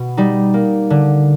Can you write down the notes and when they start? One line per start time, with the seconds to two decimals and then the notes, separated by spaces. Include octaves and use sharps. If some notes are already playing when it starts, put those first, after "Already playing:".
Already playing: B2
0.17 G3 D#4
0.54 A#3
0.90 D3